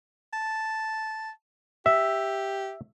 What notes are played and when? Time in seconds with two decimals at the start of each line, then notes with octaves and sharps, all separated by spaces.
0.33 A5
1.86 G4 E5